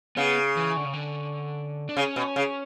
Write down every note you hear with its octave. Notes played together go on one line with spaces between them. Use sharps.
C#3 B3
E3
D3
C#3
D3
D4
C#3 C#4
B2
C#3